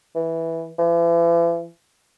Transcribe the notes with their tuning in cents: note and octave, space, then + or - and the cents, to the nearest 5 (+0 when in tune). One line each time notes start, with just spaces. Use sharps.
E3 -5
E3 +45